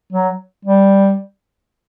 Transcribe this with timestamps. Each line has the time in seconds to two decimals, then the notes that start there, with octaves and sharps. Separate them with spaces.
0.13 F#3
0.65 G3